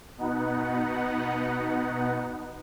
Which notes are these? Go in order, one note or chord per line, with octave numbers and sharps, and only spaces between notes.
B2 B3 D#4 F#5